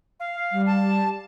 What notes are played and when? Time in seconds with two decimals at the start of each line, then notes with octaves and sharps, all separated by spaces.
0.20 F5
0.52 G3
0.66 A5